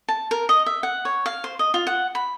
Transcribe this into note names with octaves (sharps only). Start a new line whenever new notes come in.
A5
A#4
D#5
E5
F#5
C#5
F5
C5
D#5
F4
F#5
B5